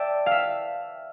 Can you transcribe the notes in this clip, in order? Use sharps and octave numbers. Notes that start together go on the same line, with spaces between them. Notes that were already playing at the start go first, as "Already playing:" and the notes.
Already playing: D5 E5 G5 A5
E5 F5